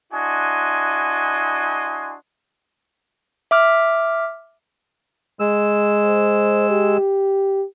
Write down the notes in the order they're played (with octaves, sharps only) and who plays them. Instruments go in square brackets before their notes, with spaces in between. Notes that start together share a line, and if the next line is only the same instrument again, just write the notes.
[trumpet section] D4 E4 F#4 D#5 G#5 C6
[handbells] E5 D6 F6
[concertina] G#3 E6
[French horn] C5
G4